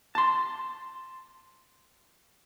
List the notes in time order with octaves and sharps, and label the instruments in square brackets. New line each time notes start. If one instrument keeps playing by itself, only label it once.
[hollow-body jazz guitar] A5 C6